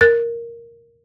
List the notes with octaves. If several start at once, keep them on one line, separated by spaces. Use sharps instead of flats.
A#4 F#6 A6